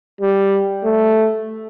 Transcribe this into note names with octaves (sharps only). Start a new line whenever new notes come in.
G3
A3